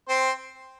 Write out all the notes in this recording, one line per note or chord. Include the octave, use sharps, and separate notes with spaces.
C4 C5